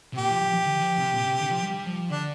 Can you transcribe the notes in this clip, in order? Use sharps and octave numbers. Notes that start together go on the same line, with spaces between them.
C3
A#2 G4
F3
F3
F3
D3
F3
C3
A#2
C3
D3
F3
G3
F3
D3 D4